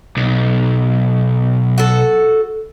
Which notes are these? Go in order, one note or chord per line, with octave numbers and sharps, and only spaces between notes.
B1
F#4 A4